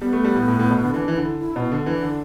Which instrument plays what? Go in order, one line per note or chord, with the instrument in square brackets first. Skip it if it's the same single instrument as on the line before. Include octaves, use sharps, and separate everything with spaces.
[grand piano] G3 [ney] B3
[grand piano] A3
G3
A2
A2
A2
B2
D3
[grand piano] E3 [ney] D4
[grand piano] E3
[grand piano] D3 [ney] E4
[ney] E4
[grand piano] B2
[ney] B3
[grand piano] D3
[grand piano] E3 [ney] D4
[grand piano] D3